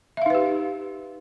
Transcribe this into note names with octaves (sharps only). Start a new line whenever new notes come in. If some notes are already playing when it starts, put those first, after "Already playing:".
D#4 G4 B4 E5 F5